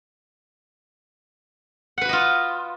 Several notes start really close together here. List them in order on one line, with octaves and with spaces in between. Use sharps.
F#5 B4 F#4 D#5 F4